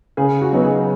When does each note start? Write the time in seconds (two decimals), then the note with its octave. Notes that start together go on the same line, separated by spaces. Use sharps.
0.17 C#3 G#4
0.41 F#4
0.52 F#3 B3 D#4
0.64 G#4